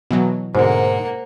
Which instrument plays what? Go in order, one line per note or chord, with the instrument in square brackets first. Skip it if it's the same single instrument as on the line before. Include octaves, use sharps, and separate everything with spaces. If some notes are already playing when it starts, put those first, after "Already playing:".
[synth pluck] B2 E3 F#3
[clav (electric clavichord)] G#2 [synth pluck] B2 D3 [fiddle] A#3 F#5 [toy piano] C5